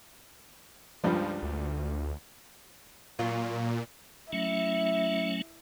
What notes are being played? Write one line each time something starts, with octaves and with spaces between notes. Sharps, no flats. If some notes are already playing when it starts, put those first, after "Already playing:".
C#2 G2 F3 G3
D2
A#2 F#3 F4
F#3 A3 C#4 E4